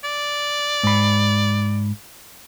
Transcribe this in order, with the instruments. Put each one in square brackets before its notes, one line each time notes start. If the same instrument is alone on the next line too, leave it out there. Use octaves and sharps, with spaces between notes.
[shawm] D5
[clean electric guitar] G#2 B5